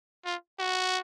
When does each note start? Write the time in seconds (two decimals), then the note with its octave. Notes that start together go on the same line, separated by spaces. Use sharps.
0.25 F4
0.59 F#4